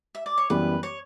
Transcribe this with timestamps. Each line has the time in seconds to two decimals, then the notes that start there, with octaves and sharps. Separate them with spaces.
0.15 E5
0.26 D5
0.38 C#5
0.50 F#2 E3 G3 B3 B4
0.83 C#5